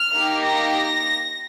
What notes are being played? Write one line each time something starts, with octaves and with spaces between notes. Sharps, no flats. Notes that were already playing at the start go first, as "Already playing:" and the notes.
Already playing: F6
A#3 D#4 G4
A#6